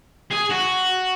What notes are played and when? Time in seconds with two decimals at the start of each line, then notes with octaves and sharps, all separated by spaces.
0.31 G#4
0.51 F#4